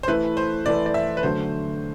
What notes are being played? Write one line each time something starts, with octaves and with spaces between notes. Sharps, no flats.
C5
E3 A3 E4 A4 B4
C5
E3 A3 E4 A4 D5
D5
E5
B4
D3 F#3 A3 D4 C5